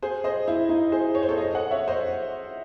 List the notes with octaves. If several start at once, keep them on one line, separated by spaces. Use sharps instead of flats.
G#4 C5
C5 D#5
E4
D#4
G#4 C5
C#5
C5
A4 C#5
C5 D#5
D#5 F#5
C#5 E5
C5 D#5